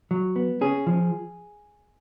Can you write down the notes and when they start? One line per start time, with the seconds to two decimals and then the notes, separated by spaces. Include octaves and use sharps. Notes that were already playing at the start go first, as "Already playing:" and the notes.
0.11 F#3
0.36 B3
0.61 C#4 G#4
0.87 F3